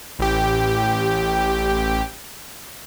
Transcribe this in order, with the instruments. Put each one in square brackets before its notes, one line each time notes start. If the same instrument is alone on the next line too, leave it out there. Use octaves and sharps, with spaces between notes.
[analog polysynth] A1 G4